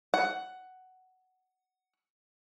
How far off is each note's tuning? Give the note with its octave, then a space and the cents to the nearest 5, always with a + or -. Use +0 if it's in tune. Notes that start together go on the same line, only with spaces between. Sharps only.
F#5 +10